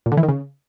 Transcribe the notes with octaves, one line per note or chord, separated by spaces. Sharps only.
A#2
D3
E3
D#3
C#3